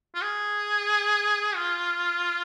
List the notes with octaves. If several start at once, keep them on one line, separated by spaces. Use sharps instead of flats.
F4
G#4
F4